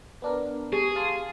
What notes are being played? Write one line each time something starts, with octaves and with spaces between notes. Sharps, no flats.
B3 D4 A#4
G4 G#4
F5 A5 C6